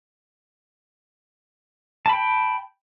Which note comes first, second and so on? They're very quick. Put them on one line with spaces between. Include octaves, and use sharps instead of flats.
A5 B5 G5